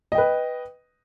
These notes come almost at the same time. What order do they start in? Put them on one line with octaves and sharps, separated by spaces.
D#5 G5 B4